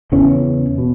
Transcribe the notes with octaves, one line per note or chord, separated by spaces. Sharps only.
E2 C#3 E3 C#4
B2